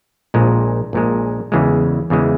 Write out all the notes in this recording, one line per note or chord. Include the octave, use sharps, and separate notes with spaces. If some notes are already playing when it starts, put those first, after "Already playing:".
A#1 A#2 G#3
A#1 A#2 G#3
E2 C#3 E3 G#3
E2 C#3 E3 G#3